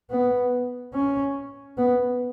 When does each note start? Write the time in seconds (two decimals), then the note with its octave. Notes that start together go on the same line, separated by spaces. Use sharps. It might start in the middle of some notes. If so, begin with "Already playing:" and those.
0.10 B3
0.94 C#4
1.78 B3